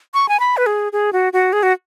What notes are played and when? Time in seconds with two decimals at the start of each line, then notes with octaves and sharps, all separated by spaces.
0.14 C#6
0.29 G#5
0.40 B5
0.57 B4
0.66 G#4
0.93 G#4
1.13 F#4
1.33 F#4
1.53 G#4
1.63 F#4